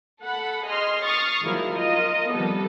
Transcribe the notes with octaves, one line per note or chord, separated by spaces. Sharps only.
A4 F#5 B5
G#4 D#5 C6 F6
C#6 D#6 F6 A6 C7
D#3 F3 F#3 G#3 A#3 E4
F4 A#4 D#5
C3 D#3 F3 G3 B3 A4